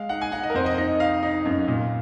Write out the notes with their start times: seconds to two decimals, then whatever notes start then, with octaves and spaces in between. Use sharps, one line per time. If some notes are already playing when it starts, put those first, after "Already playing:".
Already playing: G#3 F5
0.09 D#4 F#5
0.21 G#5
0.32 D#4 F#5
0.43 D#5
0.50 A#4
0.54 F2 C5
0.66 D#5
0.78 D#4 D#5
1.00 D#4 F5
1.23 D#4
1.45 F#2
1.68 A#2